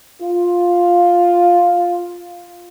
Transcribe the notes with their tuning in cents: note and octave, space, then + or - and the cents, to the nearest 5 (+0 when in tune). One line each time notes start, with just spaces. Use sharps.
F4 +5